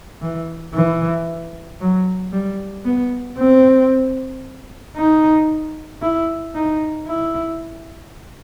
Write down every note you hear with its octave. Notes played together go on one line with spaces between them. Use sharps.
E3
E3
F#3
G3
B3
C4
D#4
E4
D#4
E4